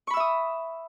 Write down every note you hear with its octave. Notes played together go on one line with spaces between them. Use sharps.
E5 B5 C#6 D#6 E6